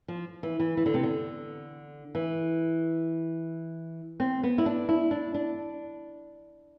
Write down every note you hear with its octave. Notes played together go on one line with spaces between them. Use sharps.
F3
E3
E3
E3
D3
C3
D3
E3
C4
B3
E4
D4
E4
D4
D4